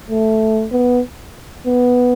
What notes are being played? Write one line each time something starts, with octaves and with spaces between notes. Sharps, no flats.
A3
B3
B3